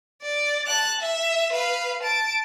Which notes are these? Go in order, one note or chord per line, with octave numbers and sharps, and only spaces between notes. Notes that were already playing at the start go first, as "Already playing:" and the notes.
D5
A5 F#6
E5
B4 F5
A5 D7